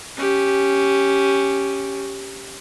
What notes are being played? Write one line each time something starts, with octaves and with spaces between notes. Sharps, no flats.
C#4 G4